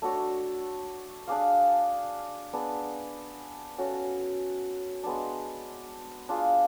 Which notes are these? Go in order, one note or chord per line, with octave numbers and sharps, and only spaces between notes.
A3 D4 F#4 C#5
D4 G#4 D5 F5
B3 D4 G#4
C#4 F#4 A4
G#3 B3 D4
D4 F4 G#4